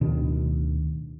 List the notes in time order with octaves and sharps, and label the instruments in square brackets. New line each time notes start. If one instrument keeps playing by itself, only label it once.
[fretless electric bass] D1 B2 D#3 D4